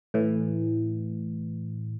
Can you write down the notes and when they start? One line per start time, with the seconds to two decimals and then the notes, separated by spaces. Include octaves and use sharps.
0.14 A2 E3